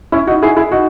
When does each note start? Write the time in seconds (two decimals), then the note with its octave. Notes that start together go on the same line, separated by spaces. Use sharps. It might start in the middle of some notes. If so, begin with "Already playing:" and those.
0.12 C#4 E4
0.27 D#4 F#4
0.42 E4 G#4
0.56 E4 G#4
0.72 D#4 F#4